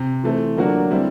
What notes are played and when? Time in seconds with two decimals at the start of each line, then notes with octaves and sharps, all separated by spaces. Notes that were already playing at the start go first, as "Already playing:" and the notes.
Already playing: C3
0.24 E3 A3 C4
0.57 D3 F#3 A#3 D4 F#4
0.90 D3 G3 C4 E4